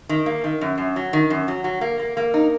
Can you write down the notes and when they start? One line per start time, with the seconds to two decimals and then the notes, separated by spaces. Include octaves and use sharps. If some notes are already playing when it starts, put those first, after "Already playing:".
0.09 D#3
0.26 A#3
0.44 D#3
0.61 F#2
0.78 F#2
0.96 F#3
1.13 D#3
1.30 F#2
1.48 F#3
1.64 F#3
1.81 A#3
1.99 A#3
2.17 A#3
2.34 D#4